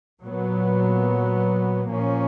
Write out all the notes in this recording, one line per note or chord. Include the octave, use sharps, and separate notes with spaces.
A#2 F#3 B3
A#2 F3 A#3 C#4